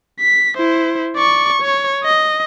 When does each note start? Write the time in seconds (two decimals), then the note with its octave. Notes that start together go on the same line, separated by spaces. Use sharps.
0.20 B6
0.57 E4 C5
1.16 D5 C#6
1.62 C#5
2.04 D#5